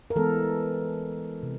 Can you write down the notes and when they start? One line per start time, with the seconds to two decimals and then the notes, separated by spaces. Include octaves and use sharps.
0.10 A#4
0.16 E3 G#3 B3 A4
1.43 C3